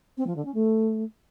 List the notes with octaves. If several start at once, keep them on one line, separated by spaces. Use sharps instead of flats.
C4
F3
D3
C#4
A3